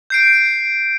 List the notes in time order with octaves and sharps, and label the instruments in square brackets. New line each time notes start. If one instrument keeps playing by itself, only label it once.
[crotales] G6 C7 D7